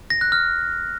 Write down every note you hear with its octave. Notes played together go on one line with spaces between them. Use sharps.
A#6
F#6
F6